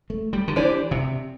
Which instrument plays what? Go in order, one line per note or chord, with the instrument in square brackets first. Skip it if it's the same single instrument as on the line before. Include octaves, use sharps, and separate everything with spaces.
[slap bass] A3
G3
D3
[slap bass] E3 [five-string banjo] D4 G4 C5
[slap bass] C3